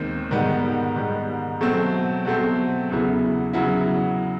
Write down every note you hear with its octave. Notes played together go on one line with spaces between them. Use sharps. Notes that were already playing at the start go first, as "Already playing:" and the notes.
Already playing: D#2 D#3 G#3 C4
G#2 D#3 G3 B3
G#2 D#3 G3 B3
B2 F#3 A3 C4
B2 F#3 A3 C4
E2 C#3 F#3 B3 E4
C#3 F#3 B3 E4